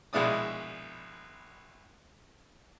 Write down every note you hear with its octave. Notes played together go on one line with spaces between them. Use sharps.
A#1 B2 G#3 E4 D5 D#6